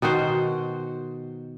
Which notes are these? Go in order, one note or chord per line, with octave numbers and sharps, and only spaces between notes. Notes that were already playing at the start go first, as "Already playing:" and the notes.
B2 D#3 F#4 C5